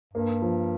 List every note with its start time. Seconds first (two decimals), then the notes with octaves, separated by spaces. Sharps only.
0.14 G2 A#3
0.42 F3